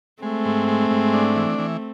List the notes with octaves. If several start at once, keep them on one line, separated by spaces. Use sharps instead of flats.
G#3 A3 C4
G#2
G#3
G#2
D4
E3
E3